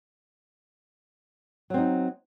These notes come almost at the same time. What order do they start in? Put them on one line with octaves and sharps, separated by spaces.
F#3 C4 D#4